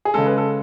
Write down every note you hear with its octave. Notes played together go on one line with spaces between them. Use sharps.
G#4
C#3 G#3 A4
B4
A4